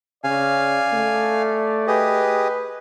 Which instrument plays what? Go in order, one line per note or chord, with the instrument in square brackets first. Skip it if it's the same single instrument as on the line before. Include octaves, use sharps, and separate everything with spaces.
[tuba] C#3 [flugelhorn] D5 [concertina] F5 G#5
[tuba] A3
[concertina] G4 G#4 D#5 [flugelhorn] B4